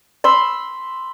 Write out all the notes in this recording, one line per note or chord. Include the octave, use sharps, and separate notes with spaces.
B5 C6 E6